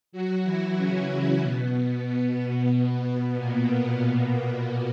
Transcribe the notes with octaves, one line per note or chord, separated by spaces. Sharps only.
F#3 F#4
E3 E4
C#3 C#4
B2 B3
B2 B3
A#2 A#3